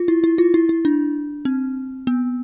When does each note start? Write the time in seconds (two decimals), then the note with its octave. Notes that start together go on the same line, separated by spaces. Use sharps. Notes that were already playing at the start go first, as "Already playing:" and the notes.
Already playing: F4
0.08 E4
0.24 E4
0.38 F4
0.54 E4
0.69 E4
0.85 D4
1.45 C4
2.07 B3